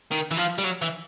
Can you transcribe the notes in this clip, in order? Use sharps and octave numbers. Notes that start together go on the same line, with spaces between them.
D#3
E3
F3
G3
F#3
E3